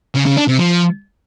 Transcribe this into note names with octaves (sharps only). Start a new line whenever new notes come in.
C#3
C#3
D4
C3
F3